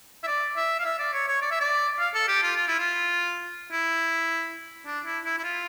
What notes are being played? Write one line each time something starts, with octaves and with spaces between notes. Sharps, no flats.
E5
D5
E5
F5
E5
D5
C#5
C#5
D5
E5
D5
F5
A4
G4
F4
F4
E4
F4
E4
D4
E4
E4
E4
F4